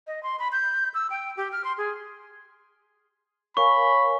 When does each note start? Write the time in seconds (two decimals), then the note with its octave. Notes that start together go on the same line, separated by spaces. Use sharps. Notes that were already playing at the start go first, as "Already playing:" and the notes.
0.07 D#5
0.23 C6
0.39 B5
0.52 G6
0.94 E6
1.10 G5
1.37 G4
1.52 F6
1.64 C6
1.78 G#4
3.57 A#4 C#5 F5 G#5 B5 C#6